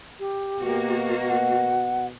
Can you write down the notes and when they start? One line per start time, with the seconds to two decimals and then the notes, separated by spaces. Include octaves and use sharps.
0.19 G4
0.59 B2 A#3 F#4
1.28 F#5